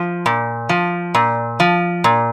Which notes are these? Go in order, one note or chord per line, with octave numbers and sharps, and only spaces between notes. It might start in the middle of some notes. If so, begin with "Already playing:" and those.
Already playing: F3
A#2
F3
A#2
F3
A#2